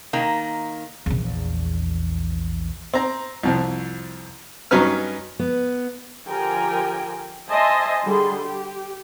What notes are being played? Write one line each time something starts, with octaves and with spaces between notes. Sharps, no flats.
D#3 A#3
A#1 E2
C4 A#5
C2 F2 F3
G2 F#3 C#4 D#4 B4 F6
B3
D3 F3 G4 A#4 G5 G#5
C5 D#5 E5 G#5 A5 C6
D3 G3 G#4 C6
G4